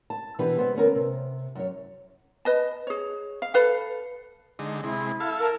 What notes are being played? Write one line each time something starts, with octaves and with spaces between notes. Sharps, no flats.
A5
B2 E3 D4 G4 B4
G3 B3 C4
D2 B3 C#4 A#4
C3
F#2 C#5
B4 D#5 A5
G#4 C#5
F5
A4 B4 F5
D3 G#3 D#4
C3 G#3 E4
A4 E5 F5
A#4 A5